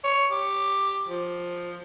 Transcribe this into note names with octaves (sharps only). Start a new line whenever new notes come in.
C#5
G4
F3